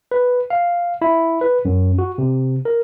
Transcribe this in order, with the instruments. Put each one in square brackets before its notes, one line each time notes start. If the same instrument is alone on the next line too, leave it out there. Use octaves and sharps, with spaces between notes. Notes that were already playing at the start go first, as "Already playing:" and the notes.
[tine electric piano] B4
F5
E4
B4
F#2
F#4
C3
A#4